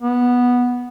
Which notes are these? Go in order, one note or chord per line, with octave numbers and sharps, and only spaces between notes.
B3